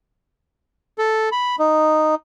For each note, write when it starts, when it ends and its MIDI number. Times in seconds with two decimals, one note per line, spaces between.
0.98 1.29 69
1.32 1.56 83
1.59 2.15 63